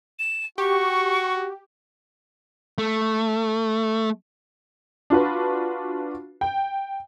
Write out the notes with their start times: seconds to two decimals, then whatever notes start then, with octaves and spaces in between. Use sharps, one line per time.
0.19 E7
0.58 F#4 G4 C#6
2.78 A3
5.10 D4 F4 F#4 B4
6.41 G5